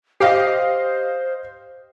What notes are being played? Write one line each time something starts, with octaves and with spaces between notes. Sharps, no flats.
G4 C5 D#5 F5 C7